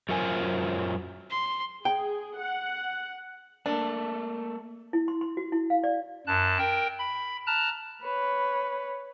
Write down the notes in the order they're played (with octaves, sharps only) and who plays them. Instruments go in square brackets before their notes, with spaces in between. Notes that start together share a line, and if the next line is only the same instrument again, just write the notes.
[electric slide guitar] F#2 F#3 F4 A#4 C5 G#5
[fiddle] C6
[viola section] G#4 [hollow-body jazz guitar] G5
[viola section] F#5
[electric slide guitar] A3 A#3 A4 [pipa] D4
[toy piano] E4
C6
C6
F#4
E4
F5
D5
[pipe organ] F#2 A5 F#6
A#4 G5
B5
A5 A#5 F6 F#6
[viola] B4 C#5